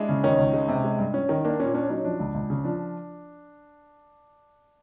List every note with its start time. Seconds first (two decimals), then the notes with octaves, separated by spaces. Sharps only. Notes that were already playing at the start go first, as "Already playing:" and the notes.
Already playing: G#3 D4 E4
0.09 C#3
0.24 D#3 C#4 D#4
0.38 C#2
0.53 G#3
0.68 C3
0.84 G#3
0.99 G2
1.14 C#4
1.29 D#3
1.45 A#3 D4
1.60 A#2 C#4
1.74 C#4 D4
1.89 F#3 C#4 D#4
2.05 F3 D4
2.19 C#2
2.34 C#2
2.50 C#3
2.64 F3 D4